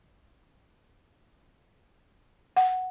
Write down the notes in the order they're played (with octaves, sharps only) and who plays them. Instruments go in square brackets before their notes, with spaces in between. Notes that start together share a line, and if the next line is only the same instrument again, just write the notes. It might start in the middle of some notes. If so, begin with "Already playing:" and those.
[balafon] F#5